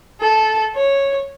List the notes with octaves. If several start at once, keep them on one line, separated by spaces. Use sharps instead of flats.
A4
C#5